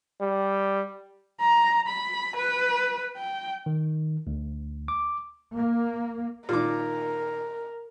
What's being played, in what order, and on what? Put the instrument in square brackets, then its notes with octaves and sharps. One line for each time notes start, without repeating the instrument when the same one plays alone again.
[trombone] G3
[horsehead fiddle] A#5
B5
B4
G5
[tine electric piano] D#3
D2
D6
[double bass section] A#3
[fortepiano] A#2 D#3 D6 [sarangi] A#4